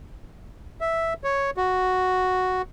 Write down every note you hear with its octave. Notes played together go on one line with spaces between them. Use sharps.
E5
C#5
F#4